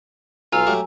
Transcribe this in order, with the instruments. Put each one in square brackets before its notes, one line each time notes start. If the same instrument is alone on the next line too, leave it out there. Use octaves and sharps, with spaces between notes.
[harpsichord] B1 [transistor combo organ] F4 [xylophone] G#5 A#5 E6
[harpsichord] F#3 A3 G4